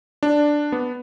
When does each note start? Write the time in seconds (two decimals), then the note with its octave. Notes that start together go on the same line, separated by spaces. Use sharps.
0.23 D4
0.72 B3